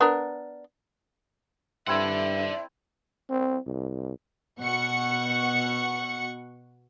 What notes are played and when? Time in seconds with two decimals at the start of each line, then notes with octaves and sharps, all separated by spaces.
0.01 B3 D4 A#4
1.87 G2 C4 E4 A4 D5 E5 F#5
3.30 C4
3.67 C2
4.60 B2 F#5 C#6 C#7